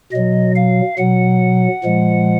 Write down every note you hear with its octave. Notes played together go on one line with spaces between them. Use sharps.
B2 F#3 D#5
F5
B2 F#3 F#5
A#2 F3 G#3